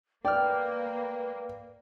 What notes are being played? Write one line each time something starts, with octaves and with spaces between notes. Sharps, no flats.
A#3 B4 D5 G5 F6